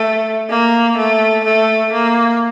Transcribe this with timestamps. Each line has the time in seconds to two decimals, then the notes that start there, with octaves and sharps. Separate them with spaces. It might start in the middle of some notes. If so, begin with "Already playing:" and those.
Already playing: A3
0.49 A#3
0.97 A3
1.44 A3
1.92 A#3